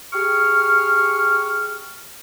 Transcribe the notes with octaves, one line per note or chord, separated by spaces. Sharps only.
G4 G#4 C#6 F6